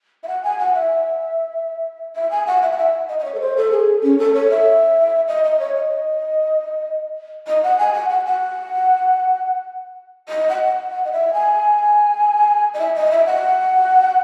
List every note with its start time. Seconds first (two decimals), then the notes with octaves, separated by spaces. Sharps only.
0.23 E5
0.28 F#5
0.43 G#5
0.58 F#5
0.74 E5
2.15 E5
2.31 G#5
2.47 F#5
2.62 E5
2.71 F#5
2.78 E5
3.09 D#5
3.19 D#5
3.24 C#5
3.34 A4
3.40 C5
3.57 A4
3.71 G#4
4.03 C#4
4.19 A4
4.34 C#5
4.50 E5
5.28 D#5
5.44 D#5
5.59 C#5
5.75 D#5
7.47 D#5
7.63 F#5
7.78 G#5
7.94 F#5
8.10 F#5
8.25 F#5
10.29 D#5
10.49 F#5
10.91 F#5
11.05 D#5
11.12 E5
11.33 G#5
12.74 D#5
12.79 E5
12.95 D#5
13.11 E5
13.26 F#5